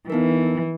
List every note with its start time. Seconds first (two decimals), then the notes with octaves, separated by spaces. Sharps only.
0.09 E3 B3 D#4 A#4